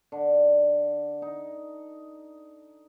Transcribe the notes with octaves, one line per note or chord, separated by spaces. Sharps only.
D3
D#4